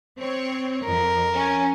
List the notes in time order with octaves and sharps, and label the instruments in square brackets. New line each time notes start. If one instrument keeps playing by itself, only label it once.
[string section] C4 C#5
[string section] F2 [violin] A#4
[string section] C#4